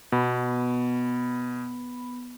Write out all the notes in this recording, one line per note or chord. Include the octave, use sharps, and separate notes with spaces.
B2 B3 B5